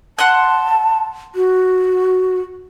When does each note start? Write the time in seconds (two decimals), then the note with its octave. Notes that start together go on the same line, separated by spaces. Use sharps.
0.19 F#5 A5 C6 F#6
1.35 F#4